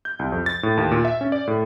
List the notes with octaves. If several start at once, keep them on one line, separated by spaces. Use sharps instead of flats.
G6
C2
F2
A6
A2
D#2
A#2
E5
C#4
D5
A2